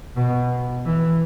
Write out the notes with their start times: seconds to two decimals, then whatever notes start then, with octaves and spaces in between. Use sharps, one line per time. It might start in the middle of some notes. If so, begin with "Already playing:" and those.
0.16 B2
0.85 E3